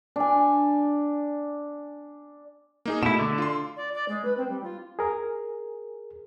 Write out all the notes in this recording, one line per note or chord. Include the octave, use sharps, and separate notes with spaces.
D4 G#5
A#3 D#4 G#4
B2 A3 E4 E7
D3
F4 C6
D5
D5
G#3
B4
C4
G3
F4
G#4 A#4